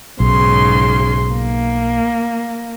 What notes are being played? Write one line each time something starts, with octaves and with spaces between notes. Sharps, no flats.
B1 G#2 C#3 C6
A#3